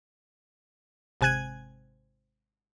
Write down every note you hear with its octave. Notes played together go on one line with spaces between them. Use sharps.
G#1 C3 G#5 F#6 G#6 D#7